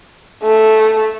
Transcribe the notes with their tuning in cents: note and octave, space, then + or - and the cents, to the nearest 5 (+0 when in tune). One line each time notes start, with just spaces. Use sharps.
A3 -5